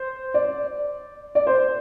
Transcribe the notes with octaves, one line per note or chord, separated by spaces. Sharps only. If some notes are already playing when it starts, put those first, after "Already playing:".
Already playing: C5
D5
D5
C5